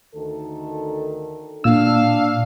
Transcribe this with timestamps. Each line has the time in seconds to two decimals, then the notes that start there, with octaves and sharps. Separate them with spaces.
0.14 D2 D#3 A4
1.64 A#2 D4 F5 E6